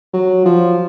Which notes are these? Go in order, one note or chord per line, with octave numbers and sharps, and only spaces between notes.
F#3
F3